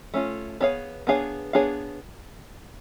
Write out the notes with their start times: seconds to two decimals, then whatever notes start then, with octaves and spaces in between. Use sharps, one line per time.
0.14 A3 C#4 F4
0.60 B3 D4 G#4 C#5 F5
1.07 B3 D4 G#4 C#5 F5
1.53 B3 D4 G#4 C#5 F5